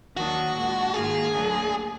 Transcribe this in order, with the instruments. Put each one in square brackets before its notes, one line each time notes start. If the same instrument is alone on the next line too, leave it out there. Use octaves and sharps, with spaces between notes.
[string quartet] D#2 D#3 F#3 D4 [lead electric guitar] F#4
[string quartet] A#2 G#3 D4
[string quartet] G#2 D#3 A#3 F4 [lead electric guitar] G#4
[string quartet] D2 D3 F#3 A#3 D4